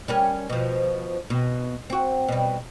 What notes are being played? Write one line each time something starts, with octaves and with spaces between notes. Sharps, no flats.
G3 C#4 A#4
B2 F3
B2
C4 F#4
B2 G3